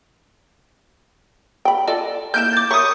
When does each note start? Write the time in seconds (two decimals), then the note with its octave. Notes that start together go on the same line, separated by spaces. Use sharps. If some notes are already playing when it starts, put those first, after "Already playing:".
1.65 G5 B5
1.88 F4 A4 D5 D#5
2.34 A#3 D#4 E4 F6 G6 D7 E7
2.53 D6 A6
2.71 A#4 C#5 E5 B5 C#6 D#6